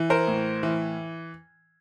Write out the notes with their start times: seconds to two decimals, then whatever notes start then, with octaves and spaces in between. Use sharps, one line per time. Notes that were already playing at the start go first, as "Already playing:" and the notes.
Already playing: E3
0.10 A#4 C5
0.27 A2
0.63 E3